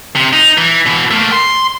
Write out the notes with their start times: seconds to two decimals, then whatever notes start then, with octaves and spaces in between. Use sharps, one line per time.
0.16 C3
0.33 D#4
0.58 E3
0.86 B2 E3
1.11 A3 A#3
1.32 C6